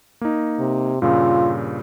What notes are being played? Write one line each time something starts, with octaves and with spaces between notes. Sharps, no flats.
A#3 D#4
C3
G2 A#2 C#3 F4